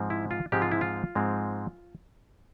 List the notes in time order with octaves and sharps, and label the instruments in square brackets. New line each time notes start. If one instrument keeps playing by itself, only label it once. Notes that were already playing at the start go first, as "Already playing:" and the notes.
Already playing: [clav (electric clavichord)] G#2 F3 G#3 C4
E4
F4
G#2 F3 G#3 C4 G4
F4
E4
F4
G#2 F3 G#3 C4